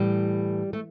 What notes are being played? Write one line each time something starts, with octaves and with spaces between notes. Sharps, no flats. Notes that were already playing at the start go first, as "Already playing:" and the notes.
Already playing: A2 E3 G3
A3